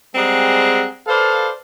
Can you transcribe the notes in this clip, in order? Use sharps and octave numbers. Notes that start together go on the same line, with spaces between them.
G3 G#3 C4 G#4 F#5 A#5
A4 B4 C5 D5 F5